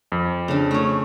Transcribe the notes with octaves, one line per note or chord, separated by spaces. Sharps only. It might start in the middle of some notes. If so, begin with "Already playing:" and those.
F2
C#3 D4
A3 C#5